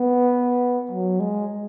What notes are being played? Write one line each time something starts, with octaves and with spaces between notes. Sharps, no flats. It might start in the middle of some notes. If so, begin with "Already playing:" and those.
Already playing: B3
F#3
G#3